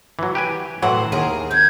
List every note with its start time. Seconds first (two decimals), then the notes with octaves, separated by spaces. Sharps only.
0.19 E3 F#3
0.35 G4 B4 G#5
0.82 A2 E3 F#3 C5 F#5
1.12 D#2 G#4 A#4
1.51 C4 G6 G#6